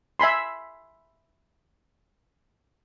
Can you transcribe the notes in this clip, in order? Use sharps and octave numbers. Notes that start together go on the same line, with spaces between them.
E5 G#5 B5 C6